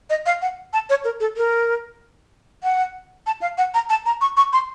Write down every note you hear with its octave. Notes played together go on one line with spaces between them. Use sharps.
D#5
F5
F#5
A5
C#5
A#4
A4
A#4
F#5
A5
F5
F#5
A#5
A5
A#5
C#6
C#6
C6